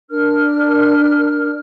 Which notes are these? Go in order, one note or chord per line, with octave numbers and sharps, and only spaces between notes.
D4 A#4 F6